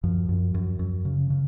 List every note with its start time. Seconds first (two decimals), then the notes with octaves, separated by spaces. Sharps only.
0.03 F#2 F3
0.29 F#2
0.54 F#2
0.79 F#2
1.05 C#3
1.30 C#3